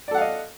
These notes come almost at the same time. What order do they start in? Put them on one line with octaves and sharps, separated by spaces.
D5 A4 F#5 F5 D#5